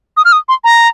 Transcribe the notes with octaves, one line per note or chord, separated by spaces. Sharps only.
D#6
F6
D#6
C6
A#5